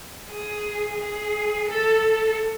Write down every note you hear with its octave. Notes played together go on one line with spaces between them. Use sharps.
G#4
G#4
A4